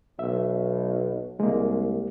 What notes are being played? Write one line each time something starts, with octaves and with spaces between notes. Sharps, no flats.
B1 E5
C2 G#3 A#3